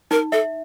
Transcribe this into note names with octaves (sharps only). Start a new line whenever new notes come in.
D#4 A#4
A4 E5